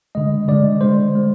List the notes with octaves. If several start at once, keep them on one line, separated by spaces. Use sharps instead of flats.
D3 G#3 D#5
D3 G#3 D5
D3 G#3 C5
D3 G#3